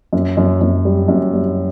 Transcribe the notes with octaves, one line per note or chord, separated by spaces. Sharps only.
F#2
F#2
F#2
G3
F#2
G3